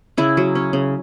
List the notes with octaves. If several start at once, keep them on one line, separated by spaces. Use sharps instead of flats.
C#3 E4
F#3
C#4
C#3